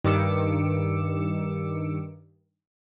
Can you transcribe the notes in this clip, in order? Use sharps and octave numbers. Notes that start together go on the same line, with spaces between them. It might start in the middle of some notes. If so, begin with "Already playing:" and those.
G2 D#3 D6 E6 C#7